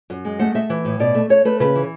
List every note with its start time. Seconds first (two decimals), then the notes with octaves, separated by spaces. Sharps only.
0.10 F#2
0.25 G#3
0.39 A3 F#5
0.55 A3 E5
0.70 E3
0.85 A2
1.00 B2 D5
1.15 A3
1.29 A3 C#5
1.45 A3 B4
1.60 C#3 B4
1.75 E3